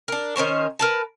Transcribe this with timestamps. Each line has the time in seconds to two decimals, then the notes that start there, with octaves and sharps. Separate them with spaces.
0.08 D4 A#4
0.36 D#3 C#4 C5 C#5
0.79 A#4 B4 A5